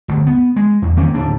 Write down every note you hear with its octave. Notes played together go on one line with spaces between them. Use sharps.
G1 D2
B3
G#3
E2
D#3 A#3 C4 C#4
D1 D#2 D4